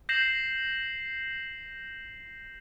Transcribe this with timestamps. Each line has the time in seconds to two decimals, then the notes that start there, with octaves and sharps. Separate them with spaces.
0.09 G6 A#6 C7 E7 F#7